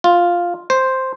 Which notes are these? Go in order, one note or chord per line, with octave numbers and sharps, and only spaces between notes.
F4
C5